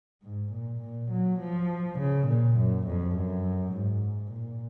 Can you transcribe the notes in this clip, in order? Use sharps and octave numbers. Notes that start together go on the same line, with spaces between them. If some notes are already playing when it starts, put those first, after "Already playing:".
G#2
A#2
A#2
F#3
F3
C#3
A#2
F#2
F2
F#2
G#2
A#2